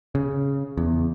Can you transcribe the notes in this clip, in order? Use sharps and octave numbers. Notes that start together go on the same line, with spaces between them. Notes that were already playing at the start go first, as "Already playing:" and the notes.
C#3
E2